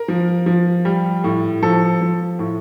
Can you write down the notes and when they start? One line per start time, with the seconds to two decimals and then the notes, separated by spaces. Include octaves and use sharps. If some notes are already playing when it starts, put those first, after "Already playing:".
Already playing: A#4
0.08 F3
0.46 F3
0.85 G3
1.24 A2
1.62 F3 A4
2.01 F3
2.39 A2